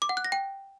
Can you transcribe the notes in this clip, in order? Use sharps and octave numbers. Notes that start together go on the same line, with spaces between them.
D6
F#5
F#6
A#6
G5